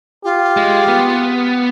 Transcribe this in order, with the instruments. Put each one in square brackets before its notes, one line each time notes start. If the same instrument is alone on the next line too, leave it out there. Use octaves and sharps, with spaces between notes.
[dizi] F4 [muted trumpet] G4
[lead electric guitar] G#3
B3